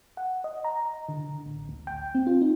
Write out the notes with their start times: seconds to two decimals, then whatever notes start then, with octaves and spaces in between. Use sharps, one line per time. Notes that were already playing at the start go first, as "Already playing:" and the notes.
0.17 F#5
0.44 D#5
0.64 A#5
1.09 D3
1.46 A1
1.69 D2
1.87 G5
2.15 C4
2.27 F4
2.41 D#4